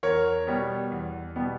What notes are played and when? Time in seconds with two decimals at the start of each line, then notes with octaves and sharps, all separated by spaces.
0.03 E2 A#4 C#5
0.47 B2 G3 B3
0.91 E2
1.36 B2 G3 B3